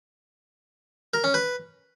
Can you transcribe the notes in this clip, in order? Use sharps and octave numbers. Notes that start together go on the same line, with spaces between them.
A#4
C#4
B4